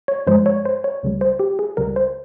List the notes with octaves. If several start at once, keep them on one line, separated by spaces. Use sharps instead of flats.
C#5
G2 F3 G#3 C5
C#5
C5
C#5
C#2 C#3 G3
C5
G4
G#4
C#2 C#3 G3 A#4
C5